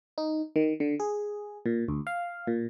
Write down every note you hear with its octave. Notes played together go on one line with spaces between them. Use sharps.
D#4
D#3
D3
G#4
A#2
D2
F5
A#2